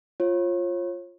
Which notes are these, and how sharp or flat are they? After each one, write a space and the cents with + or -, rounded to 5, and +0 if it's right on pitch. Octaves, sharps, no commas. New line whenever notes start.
F4 +0 C#5 -35